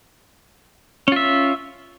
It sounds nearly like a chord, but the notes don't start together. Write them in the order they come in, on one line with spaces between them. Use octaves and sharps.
C#4 F4 E5